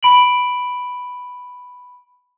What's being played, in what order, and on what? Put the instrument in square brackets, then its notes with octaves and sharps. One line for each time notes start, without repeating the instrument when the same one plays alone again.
[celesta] B5 D7 F#7